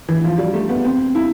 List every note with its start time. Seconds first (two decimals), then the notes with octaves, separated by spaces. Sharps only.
0.09 E3
0.24 F3
0.38 G3
0.54 A3
0.69 B3
0.85 C4
1.15 E4